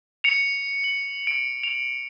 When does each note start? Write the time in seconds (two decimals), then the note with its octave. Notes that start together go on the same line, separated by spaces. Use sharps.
0.24 C#7 F7
0.84 F#7
1.27 D7
1.63 F7